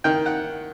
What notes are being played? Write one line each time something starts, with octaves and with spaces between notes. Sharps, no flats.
D#3 G5
F#5